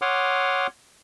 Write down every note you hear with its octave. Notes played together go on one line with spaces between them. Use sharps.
C#5 F#5 C6 D6 D#6 F6